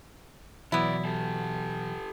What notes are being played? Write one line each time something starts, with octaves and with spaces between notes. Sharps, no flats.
C#2 B2 E3 F#3 B3 E4 D5
G4 A4